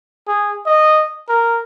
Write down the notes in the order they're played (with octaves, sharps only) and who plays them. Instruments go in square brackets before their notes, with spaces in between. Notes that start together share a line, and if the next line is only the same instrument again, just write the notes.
[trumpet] G#4
D#5
A#4